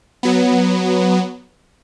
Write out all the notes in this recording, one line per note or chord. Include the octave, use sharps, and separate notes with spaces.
F#3 B3